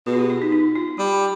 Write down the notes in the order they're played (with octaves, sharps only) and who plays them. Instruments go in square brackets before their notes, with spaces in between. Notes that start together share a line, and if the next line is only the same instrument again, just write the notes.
[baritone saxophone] B2 [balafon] G#4
[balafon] F4
G4
F4
D#4
D#4
F4
[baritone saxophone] G3 [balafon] G4